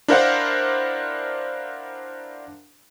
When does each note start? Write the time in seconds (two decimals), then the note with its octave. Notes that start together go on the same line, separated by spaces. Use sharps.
0.08 D4 E4 A#4 C5 F5 F#5